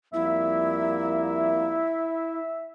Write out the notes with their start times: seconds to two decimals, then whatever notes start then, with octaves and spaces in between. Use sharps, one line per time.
0.14 F2 G3 A#3 E4 E5
1.25 E5